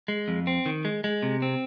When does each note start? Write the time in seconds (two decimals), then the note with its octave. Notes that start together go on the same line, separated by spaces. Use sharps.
0.08 G#3
0.28 F2
0.47 C4
0.66 D#3
0.85 G#3
1.04 G#3
1.23 C3
1.42 C4